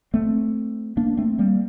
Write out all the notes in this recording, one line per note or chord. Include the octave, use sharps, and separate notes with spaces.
A3 C4
A#3 D4
A3 C4
G3 A#3